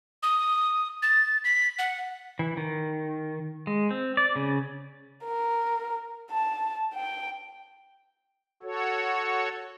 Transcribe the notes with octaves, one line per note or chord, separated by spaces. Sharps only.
D#6
A6
B6
F#5
E3
D#3
G#3
C4
D5
C#3
A#4
A5
G5
F#4 A4 C#5